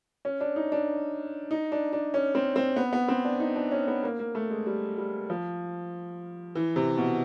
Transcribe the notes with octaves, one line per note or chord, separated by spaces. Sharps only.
C#4
D4
D#4
D4
D#4
D4
D4
C#4
C4
C4
B3
B3
C4
D4
D#4
D4
C#4
B3
A#3
A#3
A3
G#3
G3
G3
F3
E3
C3
B2